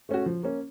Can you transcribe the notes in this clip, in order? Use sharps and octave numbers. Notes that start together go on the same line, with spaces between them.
A3 C#4 F#4
F3
A#3 C#4